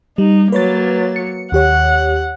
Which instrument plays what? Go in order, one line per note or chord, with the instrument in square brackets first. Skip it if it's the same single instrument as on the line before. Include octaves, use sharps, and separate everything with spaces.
[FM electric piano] G3 [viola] D#4
[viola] F#3 A#3 [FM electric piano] B4 C#5 A6
[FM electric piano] C#7
[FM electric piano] D#2 G4 C#5 [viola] F#5